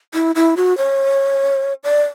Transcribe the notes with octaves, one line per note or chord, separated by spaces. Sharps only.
E4
E4
F#4
C#5
D5